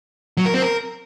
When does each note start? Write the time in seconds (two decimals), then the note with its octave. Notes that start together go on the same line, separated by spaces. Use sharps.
0.37 F#3
0.46 A#4
0.54 C4
0.62 A#4